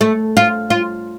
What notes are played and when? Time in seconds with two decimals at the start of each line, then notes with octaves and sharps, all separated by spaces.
0.01 A3
0.37 F4
0.70 F4